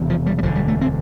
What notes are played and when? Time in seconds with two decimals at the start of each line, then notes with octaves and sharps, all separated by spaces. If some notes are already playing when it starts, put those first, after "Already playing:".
Already playing: E1 E2 C3
0.10 F3
0.26 G3
0.38 G3
0.43 E1 D2 D3 F3
0.55 G3
0.68 A3
0.81 C4